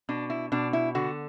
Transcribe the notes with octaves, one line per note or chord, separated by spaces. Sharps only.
B2 D4
E4
B2 D4
E4
D3 F#4